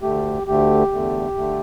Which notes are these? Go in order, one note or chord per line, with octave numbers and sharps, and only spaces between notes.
D2 D3 A3 G4
D2 D3 A3 G4
E2 D3 A3
D3 A3